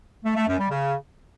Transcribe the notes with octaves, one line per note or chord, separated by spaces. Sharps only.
A3
A3
F#2
G3
C#3